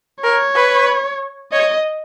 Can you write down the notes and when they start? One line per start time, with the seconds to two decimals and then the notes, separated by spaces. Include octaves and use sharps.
0.23 A#4 C#5
0.55 B4
1.52 C#5 D#5